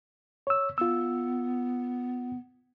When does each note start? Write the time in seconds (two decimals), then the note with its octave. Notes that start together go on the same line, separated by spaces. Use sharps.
0.47 C#5 E6
0.78 B3 F4 E6